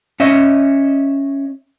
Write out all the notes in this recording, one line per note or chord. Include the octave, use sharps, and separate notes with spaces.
C#4 C#5 D#5 E5